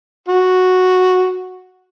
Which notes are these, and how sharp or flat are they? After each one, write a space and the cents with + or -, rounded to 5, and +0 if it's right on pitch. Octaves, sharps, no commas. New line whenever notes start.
F#4 -5